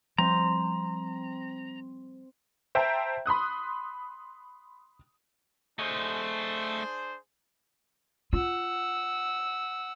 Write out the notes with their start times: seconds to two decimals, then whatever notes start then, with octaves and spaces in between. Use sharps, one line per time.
0.18 F3 G3 C4 A#5
2.75 C5 E5 G5 A5 A#5
3.26 B5 C6 D#6 F#6
5.79 A3 D4 G#4 C5 D#5
8.33 F4 F#5 E6